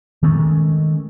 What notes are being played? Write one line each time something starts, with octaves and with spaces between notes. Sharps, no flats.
D#3 G#3 A3 C#4